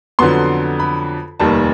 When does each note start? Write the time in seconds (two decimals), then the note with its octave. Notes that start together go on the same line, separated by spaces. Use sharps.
0.19 F2 D3 F#3 B3 C6
0.80 B5
1.40 F1 D#2 D#3 G3 A5